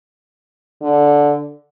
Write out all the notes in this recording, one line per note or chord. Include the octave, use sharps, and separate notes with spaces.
D3